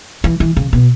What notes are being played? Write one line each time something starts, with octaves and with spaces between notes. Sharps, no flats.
E3
E3
C#3
B2